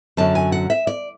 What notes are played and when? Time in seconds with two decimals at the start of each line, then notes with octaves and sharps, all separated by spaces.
0.17 F#2 D3 F#3 A5
0.35 G#5
0.52 F#5
0.70 E5
0.87 D5